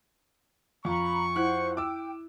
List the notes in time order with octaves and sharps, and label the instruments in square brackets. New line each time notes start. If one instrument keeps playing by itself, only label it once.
[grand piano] F2 F4 [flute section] A#5 B5 [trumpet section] C#6
[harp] E4 F#6 [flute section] C5 F#5
[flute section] G5 [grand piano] D6 E6